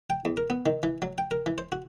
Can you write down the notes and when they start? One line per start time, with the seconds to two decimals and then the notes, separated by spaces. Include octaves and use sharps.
0.10 G5
0.25 E2
0.37 A#4
0.50 B3
0.66 D#3
0.83 E3
1.02 F#3
1.18 G5
1.31 A#4
1.46 E3
1.58 C5
1.72 F#4